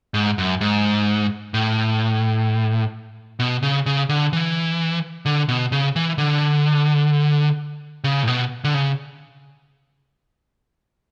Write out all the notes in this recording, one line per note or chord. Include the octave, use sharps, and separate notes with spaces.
G#2
F#2
G#2
A2
B2
C#3
C#3
D3
E3
D3
B2
C#3
E3
D3
C#3
A2
B2
D3
C#3